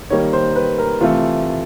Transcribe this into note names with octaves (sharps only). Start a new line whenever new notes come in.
D#3 G3 A#3 C#5
C5
B4
A#4
C3 E3 A3 F4